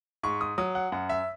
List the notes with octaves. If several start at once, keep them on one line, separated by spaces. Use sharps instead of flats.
G#2 C#6
D#6
F#3 D#6
F#5
F#2 F#5
E5